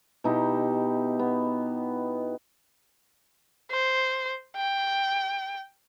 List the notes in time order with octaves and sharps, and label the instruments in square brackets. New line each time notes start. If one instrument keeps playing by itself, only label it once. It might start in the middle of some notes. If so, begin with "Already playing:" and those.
[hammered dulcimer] B2 D#4 E4 G4
B3
[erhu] C5
G5